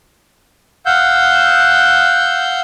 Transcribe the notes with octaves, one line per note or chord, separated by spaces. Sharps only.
F5 F#5 E6 G6